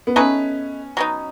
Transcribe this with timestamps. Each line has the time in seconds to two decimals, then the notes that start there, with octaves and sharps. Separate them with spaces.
0.07 B3
0.16 A3 C#4 D#4 G#4 B4
0.97 F#3 B3 D#4